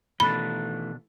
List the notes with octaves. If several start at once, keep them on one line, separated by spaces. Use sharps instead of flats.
B2 D#3 E3 A3 D4 B5